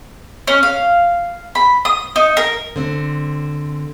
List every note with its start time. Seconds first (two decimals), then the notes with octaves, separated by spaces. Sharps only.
0.47 C#4
0.63 F5
1.55 B5
1.85 D#6
2.16 D#4
2.37 A#4
2.76 D3 C4